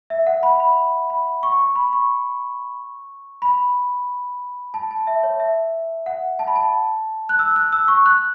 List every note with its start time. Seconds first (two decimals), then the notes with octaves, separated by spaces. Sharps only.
0.10 E5
0.27 F#5
0.43 B5
0.60 B5
1.10 B5
1.43 C#6
1.59 C#6
1.76 B5
1.93 C#6
3.42 B5
4.74 A5
4.91 A5
5.07 E5
5.23 C#5
5.40 E5
6.06 F#5
6.39 A5
6.47 B5
6.56 A5
7.29 F#6
7.39 E6
7.56 F#6
7.73 E6
7.88 C#6
8.06 F#6